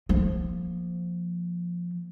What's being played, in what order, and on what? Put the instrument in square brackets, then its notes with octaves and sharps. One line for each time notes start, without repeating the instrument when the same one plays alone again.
[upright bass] F3 A#3